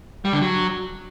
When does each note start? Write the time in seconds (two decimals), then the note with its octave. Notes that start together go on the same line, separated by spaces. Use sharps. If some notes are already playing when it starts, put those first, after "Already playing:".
0.25 G3
0.33 D3
0.41 F#3